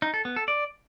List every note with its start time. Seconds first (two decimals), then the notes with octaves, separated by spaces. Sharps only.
0.02 D#4
0.14 A4
0.25 B3
0.36 A4
0.48 D5